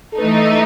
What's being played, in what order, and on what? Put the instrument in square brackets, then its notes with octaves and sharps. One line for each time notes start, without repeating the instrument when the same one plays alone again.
[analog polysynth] A4
[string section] E3 A3 D#4 [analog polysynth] B4
[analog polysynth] D#5
E5
D#5